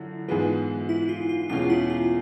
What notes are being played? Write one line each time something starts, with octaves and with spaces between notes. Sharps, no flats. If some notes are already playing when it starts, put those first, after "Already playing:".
Already playing: F#2 D3 E4 F4
G#2 E3 G#3 B3 F4
E4
F4
F4
E2 B2 G#3 C#4 F4
E4
F4